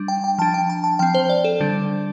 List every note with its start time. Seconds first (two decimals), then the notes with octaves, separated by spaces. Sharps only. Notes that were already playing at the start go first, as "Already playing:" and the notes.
Already playing: G3 D4
0.08 G5
0.24 G5
0.38 F3 D4 A5
0.54 G5
0.70 A5
0.84 A5
0.99 F3 C4 G5
1.15 C5
1.30 D5
1.44 A4
1.60 D3 G3 D4